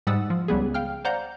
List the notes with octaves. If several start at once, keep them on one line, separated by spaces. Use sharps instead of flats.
G#2 G3 F#5 D#6 E6 A6
F3
C#2 G3 B3 G#4
F5 G5 F6
C5 D5 F5 F#5 A#5 G6